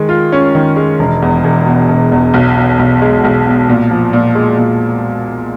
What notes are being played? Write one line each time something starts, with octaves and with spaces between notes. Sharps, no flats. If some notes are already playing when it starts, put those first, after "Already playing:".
Already playing: D#3 G#3
F4
C#4
D#3
G#3
E1
E2
E1
B2
E1
E2
B1
B2
B1
G#3
B1
B2
A#2
F3
A#2
G#3
A#2